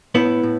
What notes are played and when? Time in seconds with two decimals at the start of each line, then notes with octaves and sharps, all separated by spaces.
0.15 A2 B3 E4
0.43 A2